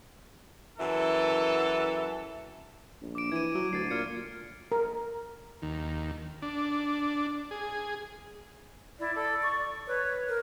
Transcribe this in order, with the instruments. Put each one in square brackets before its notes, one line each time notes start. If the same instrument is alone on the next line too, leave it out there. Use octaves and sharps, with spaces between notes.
[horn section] F#2 E3 A4
[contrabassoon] A#1
[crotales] D6 D7
[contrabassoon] E3 [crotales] G#6 D#7
[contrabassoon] F#3
[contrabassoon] D2 [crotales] A6 C7
[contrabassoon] A#2 [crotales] F6 G#6 C#7
[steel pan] A#4
[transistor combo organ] D#2
D4
G#4
[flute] E4 [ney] D5
[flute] A4
C#6
[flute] B4 [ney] C#5
[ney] A#4